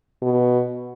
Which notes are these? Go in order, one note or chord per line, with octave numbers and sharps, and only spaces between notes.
B2